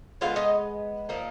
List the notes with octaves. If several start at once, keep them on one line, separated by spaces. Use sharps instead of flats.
D3 G#3 B3 F4 F5
D#4 D#5
A#2 F3 A#3 D#4